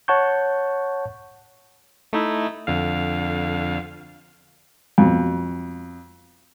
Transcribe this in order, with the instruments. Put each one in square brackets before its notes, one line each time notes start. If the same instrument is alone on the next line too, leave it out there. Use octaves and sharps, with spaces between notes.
[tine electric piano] C#5 F#5 A5 C#6 G6
[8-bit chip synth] A3 D#4 E4
F2 D3 F5
[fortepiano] F2 B2